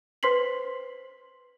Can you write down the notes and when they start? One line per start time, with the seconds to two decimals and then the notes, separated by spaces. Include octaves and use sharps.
0.23 B4 C5 C6 B6 C7 F#7